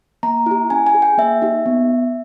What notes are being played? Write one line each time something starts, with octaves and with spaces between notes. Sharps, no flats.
A#3 A#5
E4 G4
C#4 G#5
G#5
G#4
G5
A#3 E5
D#4 G4
B3